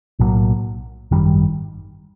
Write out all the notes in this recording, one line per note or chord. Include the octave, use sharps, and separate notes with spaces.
B1 A2 F#3 A#3
G#1 F#2 D#3 G3